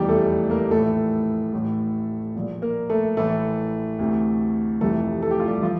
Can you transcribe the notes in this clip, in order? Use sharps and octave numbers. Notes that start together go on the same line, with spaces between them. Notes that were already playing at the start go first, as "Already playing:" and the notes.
Already playing: F1 E2 E3 G3 G4
A3 A4
A#3 A#4
A#1 A2 E3 A3 A4
A1 A2 E3
A#1 A#2
A#3 A#4
A3 A4
A1 A2 E3 A3 A4
D2 C3 E3
F1 F2 C3 E3 A3 A4
A4
G4
F4
G3 G4
E3 F3 F4